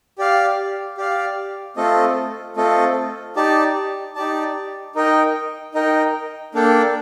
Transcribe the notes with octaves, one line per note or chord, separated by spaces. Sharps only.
G4 D5 F5
G4 D5 F5
A3 C4 F4 A4 D#5
A3 C4 F4 A4 D#5
D#4 G4 D5 A5
D#4 G4 D5 A5
D#4 A#4 D#5 G5
D#4 A#4 D#5 G5
A#3 D4 A4 D5 G5